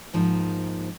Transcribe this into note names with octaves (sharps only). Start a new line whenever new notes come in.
G#2 F3 A#3 D#4